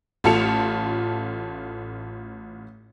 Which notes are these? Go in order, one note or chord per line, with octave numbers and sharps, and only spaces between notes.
A1 A3 F4 A5 C#7 F7